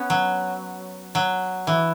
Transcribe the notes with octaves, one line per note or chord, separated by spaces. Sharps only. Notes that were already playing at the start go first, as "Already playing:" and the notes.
Already playing: B3 C#4
F#3
F#3
E3